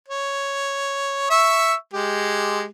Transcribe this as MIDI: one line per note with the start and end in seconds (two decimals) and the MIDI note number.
0.08 1.30 73
1.30 1.74 76
1.30 1.74 85
1.30 1.74 88
1.93 2.66 56
1.93 2.66 67